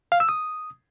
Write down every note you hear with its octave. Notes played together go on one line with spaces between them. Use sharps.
F5
E6
D#6